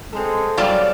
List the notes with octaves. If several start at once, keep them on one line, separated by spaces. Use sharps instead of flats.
G#3 C4 A4
F#3 G3 D5 F5 A5